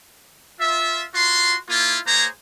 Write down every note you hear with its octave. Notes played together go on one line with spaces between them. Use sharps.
F4 E5
F4 F#4 C6
A#3 E4 F4
A#3 G#4 C5 C#5 A#5